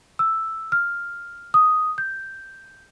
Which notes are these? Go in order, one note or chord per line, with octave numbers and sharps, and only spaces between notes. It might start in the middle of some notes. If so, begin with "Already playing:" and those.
E6
F6
D#6
G6